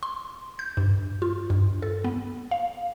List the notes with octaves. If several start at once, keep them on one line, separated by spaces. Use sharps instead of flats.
C6
G6
G2
F4
G2
A4
B3
F5